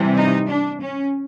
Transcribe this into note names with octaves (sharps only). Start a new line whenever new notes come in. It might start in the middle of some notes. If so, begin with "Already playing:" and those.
Already playing: C3 E3 G3
D#4
D4
C#4